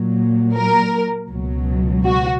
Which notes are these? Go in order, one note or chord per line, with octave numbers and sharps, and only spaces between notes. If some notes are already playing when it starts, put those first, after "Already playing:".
Already playing: A#2 F#3
A#4
C#2 B2 F#3
F#4